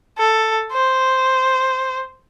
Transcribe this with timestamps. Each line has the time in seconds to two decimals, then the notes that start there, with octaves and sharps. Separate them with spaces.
0.18 A4
0.72 C5